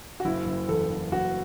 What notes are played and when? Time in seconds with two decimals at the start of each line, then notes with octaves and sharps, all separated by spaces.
0.20 F#4
0.25 F#1 E4
0.46 F#1
0.68 E2 A4
0.90 F#1
1.12 F#1 F#4